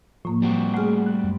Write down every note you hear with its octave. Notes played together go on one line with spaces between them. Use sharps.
A2 F3 A#3
F3 G3 C4 F#4
A3 G#4 F#5 F6
F#6
F#2